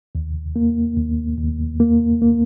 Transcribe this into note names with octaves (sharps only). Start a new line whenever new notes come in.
D#2
A#3
D#2
D#2
A#3
A#3